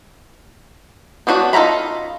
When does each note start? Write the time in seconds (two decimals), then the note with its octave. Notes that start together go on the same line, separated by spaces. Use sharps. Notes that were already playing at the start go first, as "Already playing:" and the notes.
1.27 B3 C#4 D4 F#4
1.53 D#4 F4 A4 A#5 B5